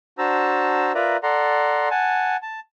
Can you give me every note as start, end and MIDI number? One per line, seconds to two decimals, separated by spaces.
0.18 0.92 62
0.18 0.92 66
0.18 0.92 72
0.18 0.92 81
0.18 0.92 82
0.18 0.92 88
0.95 1.17 65
0.95 1.17 70
0.95 1.17 71
0.95 1.17 74
0.95 1.17 76
0.95 1.17 82
1.23 1.89 69
1.23 1.89 74
1.23 1.89 78
1.23 1.89 82
1.23 1.89 84
1.91 2.37 78
1.91 2.37 80
1.91 2.37 81
2.42 2.60 81